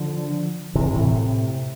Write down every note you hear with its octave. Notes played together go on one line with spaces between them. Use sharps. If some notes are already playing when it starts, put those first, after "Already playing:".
Already playing: D3 F3
C3 E3
A2 C3